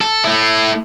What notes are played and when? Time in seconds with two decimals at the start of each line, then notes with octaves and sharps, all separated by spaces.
0.01 A4
0.24 A3 E4